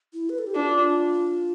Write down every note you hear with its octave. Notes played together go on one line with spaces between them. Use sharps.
E4
B4
A4
G4
D4 F4